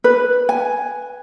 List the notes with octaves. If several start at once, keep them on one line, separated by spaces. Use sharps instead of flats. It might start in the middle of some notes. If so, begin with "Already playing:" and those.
B4
G#5